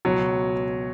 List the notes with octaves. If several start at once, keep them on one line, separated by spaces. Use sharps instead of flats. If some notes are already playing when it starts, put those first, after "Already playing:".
C#2 B2 F#3 C#5